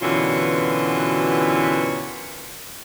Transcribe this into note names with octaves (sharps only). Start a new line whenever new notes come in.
F#2 B2 D3 E3 F4 C#5